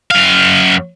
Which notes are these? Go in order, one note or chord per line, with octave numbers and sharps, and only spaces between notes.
F#2 F5